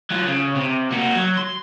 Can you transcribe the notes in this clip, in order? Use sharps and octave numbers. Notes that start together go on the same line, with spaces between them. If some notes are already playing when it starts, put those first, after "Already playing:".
F#3 F4
C#3
C3
A#3 F#4
F#3
C6